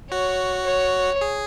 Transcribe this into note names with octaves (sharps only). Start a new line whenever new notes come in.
F#4 C#5
C#5
G#4